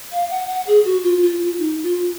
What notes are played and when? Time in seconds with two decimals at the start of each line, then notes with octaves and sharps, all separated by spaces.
0.12 F5
0.30 F#5
0.48 F#5
0.67 G#4
0.85 F#4
1.03 F4
1.22 F4
1.40 F4
1.59 D#4
1.83 F4